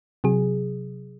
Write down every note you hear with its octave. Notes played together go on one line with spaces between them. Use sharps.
C3 F#3 G#4